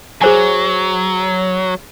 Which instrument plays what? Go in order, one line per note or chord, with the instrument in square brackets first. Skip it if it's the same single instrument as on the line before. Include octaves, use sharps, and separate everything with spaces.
[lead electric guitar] F#3 [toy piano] G#4 C5 G#5